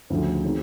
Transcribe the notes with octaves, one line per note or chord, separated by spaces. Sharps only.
D2 C#3 F3 A3
D#3 G#3 C4